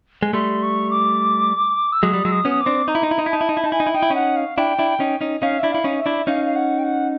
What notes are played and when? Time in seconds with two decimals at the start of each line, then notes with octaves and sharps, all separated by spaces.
0.23 G#3
0.33 G3 A3 C6
0.62 C#6
0.90 D6
1.92 E6
2.03 F#3 G#3 D#6
2.14 G3
2.25 F#3 G#3 E6
2.32 D#6
2.45 B3 C#4
2.51 D#6
2.60 D6
2.66 C4 D4
2.88 D#4 A#5
2.95 E4
3.03 D#4
3.11 E4
3.19 D#4
3.26 E4
3.31 D#4 A5
3.41 E4
3.49 D#4
3.57 E4
3.64 D#4 A5
3.72 E4 G#5
3.80 D#4
3.87 E4
3.94 D#4 G5
4.03 E4
4.10 C#4 D#4 F#5
4.36 F5
4.57 D4 E4 G5
4.79 D4 E4
5.00 C#4 D#4
5.21 C#4 D#4
5.42 C#4 D#4 F5
5.59 D4 E4 E5
5.71 E4 F5
5.84 C#4 D#4
5.98 E5
6.06 D4 E4
6.27 C#4 D#4 F5
6.45 F5
6.56 F#5
6.79 G5
6.84 F#5